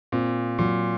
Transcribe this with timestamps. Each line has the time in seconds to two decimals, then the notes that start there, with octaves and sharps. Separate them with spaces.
0.12 A#2 C4
0.59 A#2 F#3